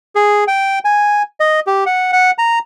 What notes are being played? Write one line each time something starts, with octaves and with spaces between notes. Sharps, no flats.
G#4
G5
G#5
D#5
G4
F#5
F#5
A#5